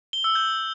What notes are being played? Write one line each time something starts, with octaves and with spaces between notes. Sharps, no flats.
G7
E6
G6